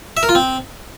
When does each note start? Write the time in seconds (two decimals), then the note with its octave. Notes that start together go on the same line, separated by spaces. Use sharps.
0.17 E5
0.23 A#4
0.29 F4
0.35 C4